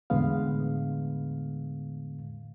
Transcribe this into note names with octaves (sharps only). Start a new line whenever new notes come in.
E2 A2 D3 G#3 B3 F5